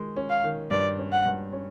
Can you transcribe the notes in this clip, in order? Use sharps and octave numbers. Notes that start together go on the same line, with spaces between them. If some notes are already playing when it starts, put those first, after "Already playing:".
Already playing: D#3 G#3
C#4
F5
D#3
G2 D5
C#4
F#5
G2
C#4